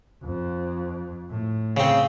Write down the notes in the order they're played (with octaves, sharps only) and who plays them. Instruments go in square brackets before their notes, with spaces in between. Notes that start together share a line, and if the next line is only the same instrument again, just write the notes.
[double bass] F2
A2
[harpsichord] C#3 C4